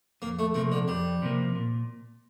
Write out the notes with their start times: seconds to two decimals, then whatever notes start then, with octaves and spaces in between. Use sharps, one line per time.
0.22 F2 A#3
0.39 A3
0.54 C3 F3 A3 A#3
0.72 D3
0.88 F2 G3
1.22 C3 F3 A#3
1.55 A#2